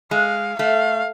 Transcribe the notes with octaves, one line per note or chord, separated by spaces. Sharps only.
G#3 F5
A3 F5